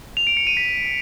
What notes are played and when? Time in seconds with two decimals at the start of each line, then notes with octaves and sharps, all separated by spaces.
0.17 F7
0.27 D7
0.37 C#7
0.47 D#7
0.57 B6